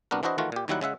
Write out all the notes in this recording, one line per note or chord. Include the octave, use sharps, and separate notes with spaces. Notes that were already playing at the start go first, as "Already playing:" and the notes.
C2 B3 D4 F#4 A#4
E3 D4 E4 F#4 C5 D#5
D#3 E3 A3 F4 F#4
A#2 G4
D#2 D#3 F#3 G3 E4 F#5
C#3 G#3 E5 F#5